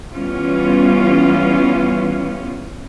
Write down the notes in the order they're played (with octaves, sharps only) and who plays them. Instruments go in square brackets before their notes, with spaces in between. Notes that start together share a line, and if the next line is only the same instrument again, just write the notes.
[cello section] E3 G3 B3 C#4 F4